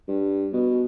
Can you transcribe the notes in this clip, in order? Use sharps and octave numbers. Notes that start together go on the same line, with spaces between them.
G2
B2